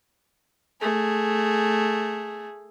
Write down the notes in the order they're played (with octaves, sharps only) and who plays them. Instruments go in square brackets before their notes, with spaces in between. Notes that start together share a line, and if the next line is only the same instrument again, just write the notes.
[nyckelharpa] A3 G#4